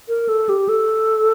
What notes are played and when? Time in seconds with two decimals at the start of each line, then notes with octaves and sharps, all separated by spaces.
0.09 A#4
0.29 A4
0.49 G4
0.69 A4